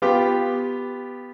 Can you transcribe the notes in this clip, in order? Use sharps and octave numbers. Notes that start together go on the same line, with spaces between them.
B3 F4 G4 G5